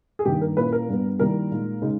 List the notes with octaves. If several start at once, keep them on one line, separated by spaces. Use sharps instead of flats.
G#4
G2 D#3 A#3 G4
A#4
A#2 A#3 C#4 E4 B4
A#4
G2 G3 B3
D#3 G3 A#3 E4 A#4
A#2 G#3 D#4
C#3 G#3 D#4